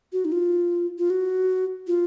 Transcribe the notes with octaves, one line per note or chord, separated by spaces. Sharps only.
F#4
D#4
F4
F4
F#4
F4